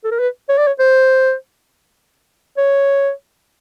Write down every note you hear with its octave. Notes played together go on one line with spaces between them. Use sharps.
A4
A#4
B4
C#5
D5
C#5
C5
C#5